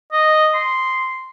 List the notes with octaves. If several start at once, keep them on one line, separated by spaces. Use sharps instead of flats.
D#5
C6